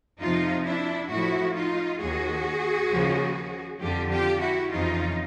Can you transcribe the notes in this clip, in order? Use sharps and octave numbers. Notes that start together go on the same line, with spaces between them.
F2 C3 F3 D#4 F4
D4 E4
A2 F3 E4 F#4
D#4 F4
D#2 D#3 F#4 G#4
D#2 C#3 F3
F2 D3 F3 F4 G4
F4 G4
E4 F#4
F2 C#3 E3 D#4 F4